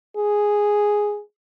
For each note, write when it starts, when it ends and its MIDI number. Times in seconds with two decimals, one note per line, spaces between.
0.17 1.21 68